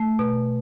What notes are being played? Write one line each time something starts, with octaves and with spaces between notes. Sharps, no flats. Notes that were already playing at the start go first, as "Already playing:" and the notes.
Already playing: A3
B2